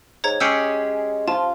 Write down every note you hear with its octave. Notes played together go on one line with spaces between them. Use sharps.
G#2 C#5 A#5 G#6
G#3 C#4 G4 G#4 E6 C#7
F3 F4 A5